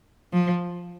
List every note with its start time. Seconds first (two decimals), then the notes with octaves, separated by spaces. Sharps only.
0.33 F3